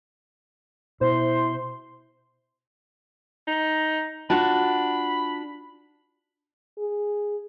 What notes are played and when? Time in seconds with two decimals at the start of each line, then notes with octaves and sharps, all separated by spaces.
1.01 B2 E4 C5 C6
3.47 D#4
4.30 D4 F4 F#4 B5
6.78 G#4